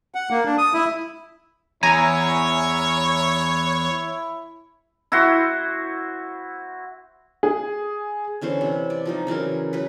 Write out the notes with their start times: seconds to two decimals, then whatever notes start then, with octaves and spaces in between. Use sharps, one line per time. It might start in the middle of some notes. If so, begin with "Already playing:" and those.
0.15 F#5
0.30 A#3
0.45 D4
0.58 D#6
0.74 E4
1.83 E2 E4 C#5 G#5 A#5
5.12 E4 F#4 C5
7.43 G#4
8.41 D3 E3 C#4 C5
8.61 C3
8.90 D5
9.06 F3 G3 D#4
9.27 C#3 E3 F#3 A#4
9.73 F#3 B4